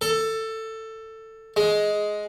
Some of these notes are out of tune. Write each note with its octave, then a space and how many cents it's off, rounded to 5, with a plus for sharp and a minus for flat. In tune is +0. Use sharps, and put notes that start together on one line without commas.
A4 +15
G#3 +10